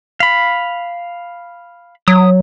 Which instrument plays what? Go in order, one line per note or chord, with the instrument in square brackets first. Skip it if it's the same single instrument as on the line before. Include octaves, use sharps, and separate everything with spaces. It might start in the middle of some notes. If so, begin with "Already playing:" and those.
[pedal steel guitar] F5 B5
[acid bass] F#3 [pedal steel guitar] D#6